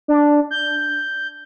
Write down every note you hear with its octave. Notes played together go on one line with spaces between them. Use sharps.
D4
G6